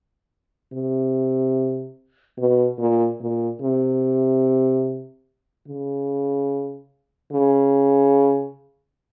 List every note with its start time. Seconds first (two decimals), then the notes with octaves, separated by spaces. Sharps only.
0.73 C3
2.38 B2
2.79 A#2
3.20 A#2
3.62 C3
5.68 C#3
7.33 C#3